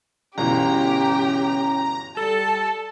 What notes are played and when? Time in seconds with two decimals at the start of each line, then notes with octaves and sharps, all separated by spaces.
0.38 G1 B2 E3 C#4 G4 A#5
2.17 G3 A4 A5